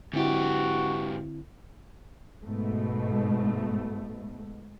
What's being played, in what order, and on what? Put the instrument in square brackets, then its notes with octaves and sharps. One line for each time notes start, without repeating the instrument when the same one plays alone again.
[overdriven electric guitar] G#2 G4 [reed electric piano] D3 C4 E4 [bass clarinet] F#4
[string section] G#2 B2 A3